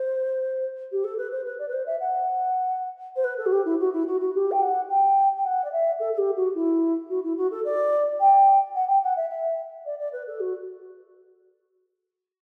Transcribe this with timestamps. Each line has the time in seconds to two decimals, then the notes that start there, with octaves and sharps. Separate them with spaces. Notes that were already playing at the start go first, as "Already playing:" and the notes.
Already playing: C5
0.92 G4
1.04 A4
1.18 B4
1.31 C5
1.45 B4
1.59 D5
1.68 B4
1.73 C5
1.86 E5
2.00 F#5
3.16 C5
3.24 B4
3.38 A4
3.46 F#4
3.52 G4
3.65 E4
3.80 F#4
3.93 E4
4.07 F#4
4.20 F#4
4.35 G4
4.51 G5
4.61 F#5
4.89 G5
5.36 G5
5.44 F#5
5.64 D5
5.72 E5
6.00 A4
6.13 A4
6.18 G4
6.36 F#4
6.55 E4
7.10 F#4
7.23 E4
7.37 F#4
7.51 A4
7.65 D5
8.20 G5
8.75 F#5
8.88 G5
9.03 F#5
9.16 E5
9.30 E5
9.85 D5
9.99 D5
10.13 B4
10.27 A4
10.40 F#4